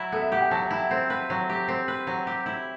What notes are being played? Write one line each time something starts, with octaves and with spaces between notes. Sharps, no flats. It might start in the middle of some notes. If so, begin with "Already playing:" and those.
Already playing: F#3 E4
B3 A4
E5
G4 F#5
G5
F#3 A5
E4
C4
B4
F#3
G4
C4
B4
F#3
G4
E4